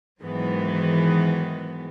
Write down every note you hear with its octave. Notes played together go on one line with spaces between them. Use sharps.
G#2 D#3 E3 F#3 G#3 B3